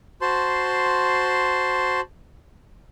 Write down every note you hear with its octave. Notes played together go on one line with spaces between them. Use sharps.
F#4 C5 A5 C6